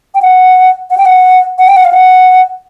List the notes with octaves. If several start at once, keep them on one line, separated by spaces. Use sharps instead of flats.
G5
F#5
F#5
G5
F#5
F#5
G5
F#5
F5
F#5